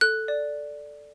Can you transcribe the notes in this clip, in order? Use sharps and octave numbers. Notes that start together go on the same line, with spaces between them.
A4 F#6
D5